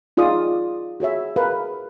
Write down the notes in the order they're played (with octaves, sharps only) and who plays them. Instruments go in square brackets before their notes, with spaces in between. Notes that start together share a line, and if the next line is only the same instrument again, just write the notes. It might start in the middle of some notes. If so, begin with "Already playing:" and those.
[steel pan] D#4 F4 G#4 D5 D#6
F#4 G#4 C#5 E5
G#4 A#4 B4 F5